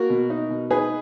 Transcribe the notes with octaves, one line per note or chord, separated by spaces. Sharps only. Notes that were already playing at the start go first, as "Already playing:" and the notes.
Already playing: A#3 F#4 A#4
B2
D#4
B2
D#4 G#4 B4